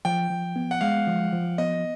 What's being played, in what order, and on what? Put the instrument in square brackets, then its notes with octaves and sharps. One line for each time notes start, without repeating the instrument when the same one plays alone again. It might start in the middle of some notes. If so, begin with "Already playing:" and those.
[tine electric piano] F3 [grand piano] G5
[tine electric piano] F3
B3
[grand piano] F#5
[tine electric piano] G#3 [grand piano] F5
[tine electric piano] F3
F3
[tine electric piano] B3 [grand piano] D#5